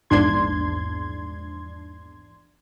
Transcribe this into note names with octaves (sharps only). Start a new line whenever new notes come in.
A#1 E2 G#2 D4 C6 G#6